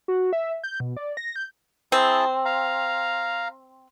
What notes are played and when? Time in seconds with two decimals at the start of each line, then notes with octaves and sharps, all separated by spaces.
0.08 F#4
0.33 E5
0.64 G6
0.80 B2
0.97 D5
1.17 A#6
1.36 G6
1.92 C4 E4 G#4 A5
2.45 F5 A#5